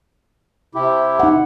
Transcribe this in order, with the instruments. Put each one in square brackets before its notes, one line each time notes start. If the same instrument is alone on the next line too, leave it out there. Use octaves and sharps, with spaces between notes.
[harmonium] C3 E4 G4
[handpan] D#4 F#5